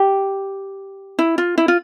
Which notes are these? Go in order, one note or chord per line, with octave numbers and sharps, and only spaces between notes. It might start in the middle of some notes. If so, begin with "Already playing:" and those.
Already playing: G4
E4
F4
E4
F4